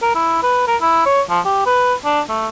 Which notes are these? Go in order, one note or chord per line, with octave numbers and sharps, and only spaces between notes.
A#4
E4
B4
A#4
E4
C#5
F3
G4
B4
D4
A3